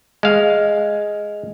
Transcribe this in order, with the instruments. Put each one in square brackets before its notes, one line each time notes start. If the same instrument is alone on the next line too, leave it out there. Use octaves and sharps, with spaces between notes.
[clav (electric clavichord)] G#3 F5